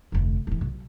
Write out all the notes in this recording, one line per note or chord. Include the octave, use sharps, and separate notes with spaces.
F1 D2
D1 E3
B1